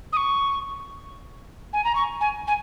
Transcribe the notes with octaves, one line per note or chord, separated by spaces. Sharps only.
D#6
C#6
G#5
A#5
C#6
G#5
G#5